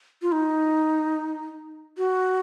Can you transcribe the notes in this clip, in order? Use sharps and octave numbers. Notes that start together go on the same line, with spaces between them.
F4
D#4
F#4